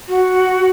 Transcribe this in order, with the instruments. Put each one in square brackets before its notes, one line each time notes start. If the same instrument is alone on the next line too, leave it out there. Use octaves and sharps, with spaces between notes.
[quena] F#4